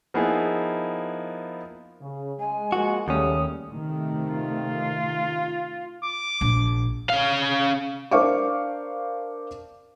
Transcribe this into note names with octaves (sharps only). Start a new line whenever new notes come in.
F3 A#3 B3 D#4 E4 G#4
C#3
G#3 G#5
F3 G#3 A#3 F#4
D#2 C#3 G3 A3 C#4 D#6
C3 D#3 A3
F4
D6
A#1
C#4 F5
D4 A#4 C5 F5 C#6 D6